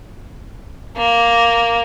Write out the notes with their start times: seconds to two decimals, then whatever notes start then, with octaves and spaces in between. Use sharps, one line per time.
0.97 A#3